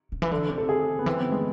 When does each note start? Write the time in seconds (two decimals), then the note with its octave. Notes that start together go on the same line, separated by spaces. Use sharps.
0.12 C3
0.22 E3
0.31 D3
0.50 C3
0.58 A4
0.69 G#4
0.99 B3
1.06 E3 C4
1.19 B3
1.31 G#3